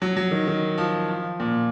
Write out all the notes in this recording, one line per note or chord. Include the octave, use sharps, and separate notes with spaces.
F#3
F#3
D#3
D#3
F3
F3
A#2